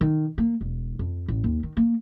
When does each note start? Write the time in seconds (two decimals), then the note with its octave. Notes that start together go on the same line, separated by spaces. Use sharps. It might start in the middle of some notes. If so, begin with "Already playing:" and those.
0.01 D#3
0.38 A#3
0.61 E1
0.99 F2
1.28 A1
1.44 D#2
1.63 D#3
1.77 A#3